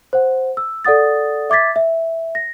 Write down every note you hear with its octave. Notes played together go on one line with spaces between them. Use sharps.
C5 F#5
E6
A4 D5 F#5 D#6 A6
E5 D6 G#6 A6 B6
E5
A#6